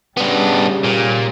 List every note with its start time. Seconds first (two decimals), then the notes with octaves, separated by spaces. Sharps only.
0.17 C#3 G3 B3 D4
0.84 A#2